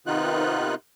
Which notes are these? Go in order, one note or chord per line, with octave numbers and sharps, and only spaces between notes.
C3 D#3 B3 D#4 F4 F#6